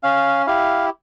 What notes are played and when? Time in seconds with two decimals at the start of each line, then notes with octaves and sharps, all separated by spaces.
0.03 C#4 F5
0.47 E4 G4 F5